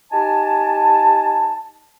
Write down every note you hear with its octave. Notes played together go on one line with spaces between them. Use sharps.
D#4 G4 G#5 A5